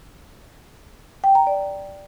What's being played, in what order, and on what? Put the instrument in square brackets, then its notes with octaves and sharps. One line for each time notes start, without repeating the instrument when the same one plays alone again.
[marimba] G5
A#5
D5